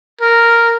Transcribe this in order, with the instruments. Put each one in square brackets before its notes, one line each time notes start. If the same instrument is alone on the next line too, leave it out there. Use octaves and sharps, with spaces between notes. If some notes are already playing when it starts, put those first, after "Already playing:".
[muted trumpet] A#4